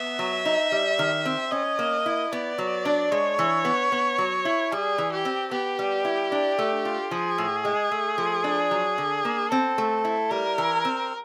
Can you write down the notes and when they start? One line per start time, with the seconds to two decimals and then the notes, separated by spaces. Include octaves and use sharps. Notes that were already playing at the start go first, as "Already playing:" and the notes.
Already playing: B3 E5
0.19 F#3
0.45 D#4
0.72 G3
0.99 D#3
1.26 C4
1.52 C#4 D#5
1.79 A#3
2.06 E4
2.32 B3 D5
2.58 F#3
2.85 D4
3.11 G#3 C#5
3.39 E3
3.65 B3
3.92 B3
4.18 F#3
4.45 E4
4.72 G3 G#4
4.98 E3
5.12 G4
5.25 C4
5.51 B3 G4
5.79 G3
6.05 E4
6.32 D4
6.58 A3
6.85 F4
7.11 F3 G#4
7.38 A2
7.65 G#3
7.91 A3
8.18 F3
8.44 D4
8.71 F#3
8.98 D3
9.25 A#3
9.51 C4 A4
9.78 A3
10.05 E4
10.31 G3 A#4
10.58 E3
10.85 C4